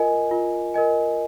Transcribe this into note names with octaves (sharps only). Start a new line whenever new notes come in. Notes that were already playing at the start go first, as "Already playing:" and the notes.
Already playing: F4 A#4 D#5 G#5
F4
A#4 D#5 G#5